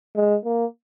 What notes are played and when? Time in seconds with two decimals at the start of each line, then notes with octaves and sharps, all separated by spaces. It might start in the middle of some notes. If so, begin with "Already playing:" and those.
0.16 G#3
0.45 A#3